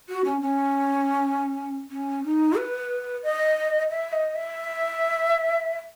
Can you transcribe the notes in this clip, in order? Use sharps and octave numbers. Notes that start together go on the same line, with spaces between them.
F#4
C#4
C#4
C#4
D#4
B4
D#5
E5
D#5
E5